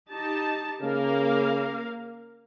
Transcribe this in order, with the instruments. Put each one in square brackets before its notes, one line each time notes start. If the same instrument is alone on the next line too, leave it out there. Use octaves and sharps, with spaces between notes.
[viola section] D#4 G4 A5
[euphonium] C#3 [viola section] A#3 A#4 F5